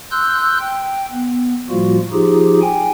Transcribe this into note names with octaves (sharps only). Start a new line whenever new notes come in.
C6 E6 F#6 G6
G5
B3
A2 F3 G3 A#3 F4 F#4
F3 D#4 F4 G4 G#4
G5 G#5